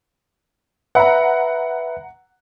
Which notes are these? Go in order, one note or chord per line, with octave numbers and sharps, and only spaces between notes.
B4 E5 F#5 A#5 B5